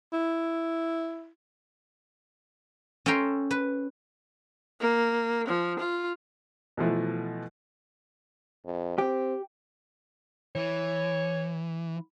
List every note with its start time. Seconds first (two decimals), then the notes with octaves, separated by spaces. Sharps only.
0.13 E4
3.06 C#4 A4 E5 G5 A#5 C6
3.51 B4
4.80 A#3
5.47 F3
5.79 F4
6.77 B2 E3 F3 A3
8.66 F2
8.98 C4 G4
10.55 E3 C#5